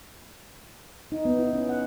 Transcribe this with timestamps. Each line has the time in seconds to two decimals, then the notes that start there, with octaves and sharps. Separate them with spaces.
1.12 D#4
1.25 B3
1.39 E4
1.53 C#4
1.69 F#5